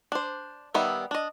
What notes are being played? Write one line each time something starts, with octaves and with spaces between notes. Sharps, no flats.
D4 C5
D#3 G3 B3 E5
D4 D#5